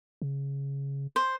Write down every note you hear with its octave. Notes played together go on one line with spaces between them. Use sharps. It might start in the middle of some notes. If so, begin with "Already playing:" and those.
C#3
C5